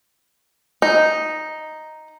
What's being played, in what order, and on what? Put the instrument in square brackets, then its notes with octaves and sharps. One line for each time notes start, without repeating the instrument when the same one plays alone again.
[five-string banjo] D#4